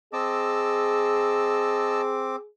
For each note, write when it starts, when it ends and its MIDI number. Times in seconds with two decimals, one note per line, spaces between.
0.13 2.36 60
0.13 2.47 68
0.13 2.01 75
0.13 2.01 81
0.13 2.36 86
0.13 2.01 88